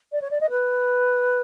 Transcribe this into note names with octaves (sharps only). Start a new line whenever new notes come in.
D5
C#5
D5
D#5
B4